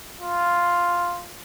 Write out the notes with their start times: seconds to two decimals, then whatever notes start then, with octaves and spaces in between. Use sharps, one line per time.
0.20 F4